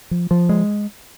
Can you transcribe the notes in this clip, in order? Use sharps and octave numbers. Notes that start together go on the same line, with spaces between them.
F3
F3
G#3